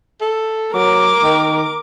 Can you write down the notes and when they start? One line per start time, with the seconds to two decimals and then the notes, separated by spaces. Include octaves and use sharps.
0.21 A4
0.74 F#3 A#4 D6
1.23 D#3